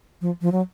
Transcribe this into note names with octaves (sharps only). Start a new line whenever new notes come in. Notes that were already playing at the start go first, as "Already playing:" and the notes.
F3
F3
F#3